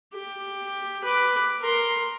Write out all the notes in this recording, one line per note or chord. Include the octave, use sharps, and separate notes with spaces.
G4
B4 D6
A#4 C6